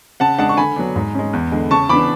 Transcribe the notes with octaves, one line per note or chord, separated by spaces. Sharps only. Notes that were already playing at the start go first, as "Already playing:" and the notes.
C#3 F#5 A5
G#3 D4 F#5 A5
C#6
D3 G#5 B5
F#3 B3 D4
G#2
G#3 C#4
E2
D3 G#3
C#3 A5 C#6
E3 B3 D4 B5 D6